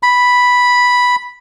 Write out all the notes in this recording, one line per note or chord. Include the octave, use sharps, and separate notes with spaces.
B5